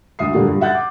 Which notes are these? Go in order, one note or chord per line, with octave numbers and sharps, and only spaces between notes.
D2 E5 D#6 C7
A#2 D3 G3 A3 A#3 F4
G2 F#3
E5 F#5 F#6 G6 A6
D6